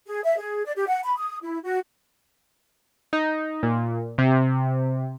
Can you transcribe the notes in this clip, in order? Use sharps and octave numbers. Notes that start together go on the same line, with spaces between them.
G#4
E5
G#4
D5
G4
F#5
B5
D#6
E4
F#4
D#4
A#2
C3